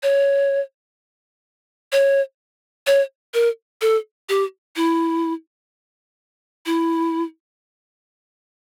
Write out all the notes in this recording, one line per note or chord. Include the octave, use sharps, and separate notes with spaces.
C#5
C#5
C#5
A#4
A4
G4
E4
E4